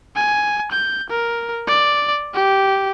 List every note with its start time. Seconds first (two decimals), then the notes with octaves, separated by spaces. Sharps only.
0.16 G#5
0.72 G6
1.10 A#4
1.67 D5
2.34 G4